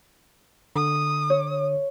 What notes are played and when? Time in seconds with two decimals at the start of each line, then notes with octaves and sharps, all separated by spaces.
0.76 D3 D#6
1.30 C#5